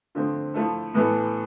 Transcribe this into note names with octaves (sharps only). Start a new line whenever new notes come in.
D3 F3 A3 C4
F3 A3 E4 A4
A2 E3 B3 E4 A4